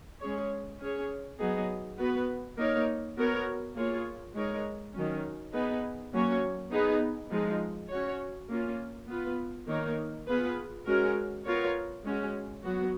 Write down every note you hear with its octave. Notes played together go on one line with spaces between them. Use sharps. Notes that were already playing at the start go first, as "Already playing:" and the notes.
G#3 C#4 G#4 C#5
C#4 G#4 C#5
F#3 B3 D#4 G#4
B3 F#4 B4
A#3 D#4 A#4 C#5
B3 F#4 A#4 C#5
A#3 F4 G#4 C#5
G#3 D#4 A#4 C#5
D#3 F#3 C#4
B3 D#4 G#4 B4
F#3 A#3 C#4 F#4 C#5
B3 D#4 G#4 B4
F3 G#3 D#4
C#4 F#4 C#5
A#3 C#4 F4
B3 F4 B4
D#3 A#3 D#4 A#4 C#5
B3 F4 G#4 B4
G#3 C#4 F#4 A#4
B3 F4 A#4 C#5
G#3 C#4 F#4
F#3 B3 F#4